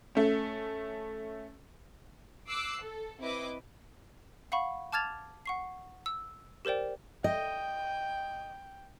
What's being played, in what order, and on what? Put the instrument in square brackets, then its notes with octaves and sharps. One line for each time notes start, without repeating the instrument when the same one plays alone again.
[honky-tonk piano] A3 C#4
[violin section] D6 E6 F#6 C7
A4
C4 E4 B4 D#5 D6
[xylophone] F5 F#5 B5 C#6
A5 D6 F6 G#6 A6 F7
F#5 C#6 C7
E6
G4 A#4 C5 D5 G5
[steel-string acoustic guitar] D#5 [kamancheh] G5